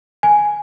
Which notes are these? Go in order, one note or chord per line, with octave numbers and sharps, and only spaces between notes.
G#5